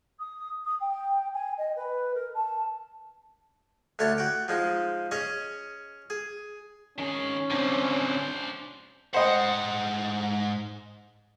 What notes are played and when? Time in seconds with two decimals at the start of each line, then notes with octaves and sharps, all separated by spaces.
0.19 D#6
0.64 D#6
0.80 G5
1.33 G#5
1.58 D#5
1.76 B4
2.14 A#4
2.34 A5
3.99 D2 A3 C#5 A5
4.18 F#4 G5
4.48 F3 G#3 D#4
5.11 C#4 G#4 C#5 D#5
6.10 G#4
6.99 D#3 C#4 G#4
7.51 D3 C4 D4 C5
9.14 G#2 C5 D#5 F#5 G5